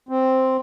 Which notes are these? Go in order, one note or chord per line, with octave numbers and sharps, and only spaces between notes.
C4